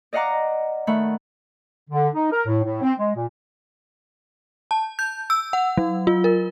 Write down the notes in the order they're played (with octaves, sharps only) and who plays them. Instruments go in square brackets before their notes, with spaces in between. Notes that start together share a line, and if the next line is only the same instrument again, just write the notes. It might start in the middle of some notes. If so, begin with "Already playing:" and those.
[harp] D5 D#5 F5 F#5 A#5 D6
D#3 A3 F#5 B5
[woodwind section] D3
D#4
A#4
A2
A2
C4
G#3
A#2
[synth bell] A5
G6
E6
F#5
F#3
F4
A#4